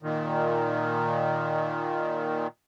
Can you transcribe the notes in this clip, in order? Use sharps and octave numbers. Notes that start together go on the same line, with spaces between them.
A#2 D#3